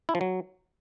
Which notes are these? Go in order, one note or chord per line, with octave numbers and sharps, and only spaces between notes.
E4
F3
F#3